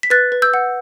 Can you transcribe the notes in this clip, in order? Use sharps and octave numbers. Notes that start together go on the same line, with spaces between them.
B6
B4 F#6 A6
B4
E6 G6
F#5